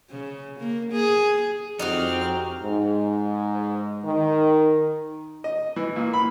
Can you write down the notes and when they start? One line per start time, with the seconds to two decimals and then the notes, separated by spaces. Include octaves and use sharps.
0.10 C#3
0.60 A#3
0.92 G#4
1.79 F2 C4 D#4 F#4 G4 F6
2.62 G#2
4.05 D#3
5.44 D#5
5.76 E3
5.96 A#2
6.13 B5